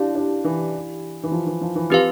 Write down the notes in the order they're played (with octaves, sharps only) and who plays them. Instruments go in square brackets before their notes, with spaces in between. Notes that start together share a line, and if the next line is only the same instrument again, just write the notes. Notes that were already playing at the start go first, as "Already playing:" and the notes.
Already playing: [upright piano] D4 [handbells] E4 G4 D5 F5
[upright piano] D4
E3
E3
F3
E3
F3
E3
[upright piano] F3 [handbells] C4 G4 B4 F5